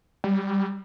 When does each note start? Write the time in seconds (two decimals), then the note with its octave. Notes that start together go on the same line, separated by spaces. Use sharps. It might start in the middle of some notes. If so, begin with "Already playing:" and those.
0.24 G3